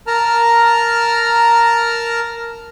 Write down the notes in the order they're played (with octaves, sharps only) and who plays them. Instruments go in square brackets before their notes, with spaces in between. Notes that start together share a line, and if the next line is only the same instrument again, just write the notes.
[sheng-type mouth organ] A#4 A5 A#5 F6